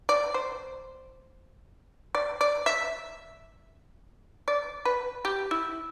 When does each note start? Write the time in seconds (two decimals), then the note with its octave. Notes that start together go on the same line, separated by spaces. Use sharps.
0.09 D5
0.34 C5
2.15 D5
2.41 D5
2.66 E5
4.48 D5
4.85 B4
5.25 G4
5.51 E4